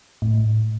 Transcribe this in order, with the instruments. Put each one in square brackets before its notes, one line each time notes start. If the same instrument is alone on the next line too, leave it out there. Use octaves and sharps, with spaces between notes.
[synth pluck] A2